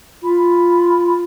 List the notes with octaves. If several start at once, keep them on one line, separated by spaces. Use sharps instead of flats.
F4 B5